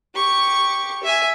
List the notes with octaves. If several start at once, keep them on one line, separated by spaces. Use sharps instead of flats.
G4 C#6
E5 G#5